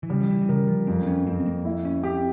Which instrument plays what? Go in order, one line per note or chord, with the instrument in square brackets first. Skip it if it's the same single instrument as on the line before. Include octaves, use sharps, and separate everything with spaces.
[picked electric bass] E3
[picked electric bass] C#3 [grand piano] G3
[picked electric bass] F3
E3
E3
[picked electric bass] C#3 [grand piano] A#4
[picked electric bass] F3
[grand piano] F2 [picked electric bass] C4
[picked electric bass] C4
C#4
[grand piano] F2 [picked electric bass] C4
[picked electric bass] C4
A#3
[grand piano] E4
[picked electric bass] C#4
[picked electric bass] C4 [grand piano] G4